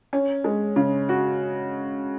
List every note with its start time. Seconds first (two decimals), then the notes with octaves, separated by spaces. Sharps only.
0.13 C#4
0.44 G#3
0.76 C#3
1.09 F#4